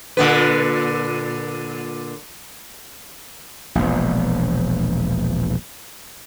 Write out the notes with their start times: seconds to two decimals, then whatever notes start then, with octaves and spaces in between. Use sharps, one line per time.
0.17 A#2 D3 B4
3.75 E1 A#1